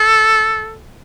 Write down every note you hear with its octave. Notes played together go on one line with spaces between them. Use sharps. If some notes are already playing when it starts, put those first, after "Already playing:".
Already playing: A4